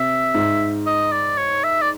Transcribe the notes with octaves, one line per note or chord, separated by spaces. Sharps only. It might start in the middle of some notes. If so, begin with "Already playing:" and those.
Already playing: C3 E5
G#2
D#5
D5
C#5
E5
D5